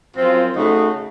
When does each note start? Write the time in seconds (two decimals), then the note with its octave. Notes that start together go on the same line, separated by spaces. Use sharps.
0.16 F#2 F3 C4 F4
0.55 C#3 A3 D#4 F#4